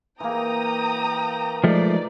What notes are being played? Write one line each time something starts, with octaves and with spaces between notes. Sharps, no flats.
E3 A#3 G5 A#5 D#6
F3 G#3 A3 D#4 D5